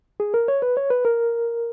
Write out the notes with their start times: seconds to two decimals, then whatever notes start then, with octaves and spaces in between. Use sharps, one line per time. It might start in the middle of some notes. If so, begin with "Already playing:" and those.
0.20 G#4
0.34 A#4
0.48 C#5
0.62 B4
0.77 C#5
0.90 B4
1.05 A#4